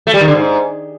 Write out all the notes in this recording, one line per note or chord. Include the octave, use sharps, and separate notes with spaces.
A3
G3
D#3
D3
G#2